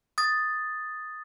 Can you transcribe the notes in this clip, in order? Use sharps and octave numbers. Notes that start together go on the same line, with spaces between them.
D#6 A6